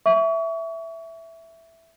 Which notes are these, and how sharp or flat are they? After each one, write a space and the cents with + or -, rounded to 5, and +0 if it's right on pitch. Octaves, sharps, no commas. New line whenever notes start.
E5 +0 C#6 +35